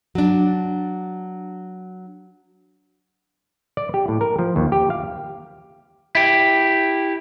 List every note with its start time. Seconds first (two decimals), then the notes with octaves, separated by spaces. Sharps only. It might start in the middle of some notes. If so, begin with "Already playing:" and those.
0.15 F#3 D4
3.77 D5
3.94 G4
4.08 A2
4.21 A#4
4.39 F3
4.56 D#2
4.72 G4
4.90 F5
6.15 E4 G4